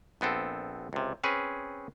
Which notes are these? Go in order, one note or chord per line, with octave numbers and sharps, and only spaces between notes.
A#1 B3 C4 A4
C#2 C3
C4 C#4 G#4 B4